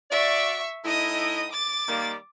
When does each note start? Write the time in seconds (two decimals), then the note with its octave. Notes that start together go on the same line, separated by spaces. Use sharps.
0.11 F#4 D5 E5 C#6
0.85 A2 D#4 E4 D#5 D#6
1.51 D6 A6
1.88 D#3 G3 A#3